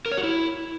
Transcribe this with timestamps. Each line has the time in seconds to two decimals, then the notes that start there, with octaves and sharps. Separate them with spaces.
0.06 A#4
0.12 C#5
0.17 F#4
0.23 E4